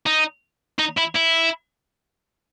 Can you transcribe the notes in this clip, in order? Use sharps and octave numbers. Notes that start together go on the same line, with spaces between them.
D#4
D#4
E4
E4